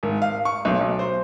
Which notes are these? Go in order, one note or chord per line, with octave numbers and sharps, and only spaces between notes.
G#1
F5
C#6
B1
B1
C5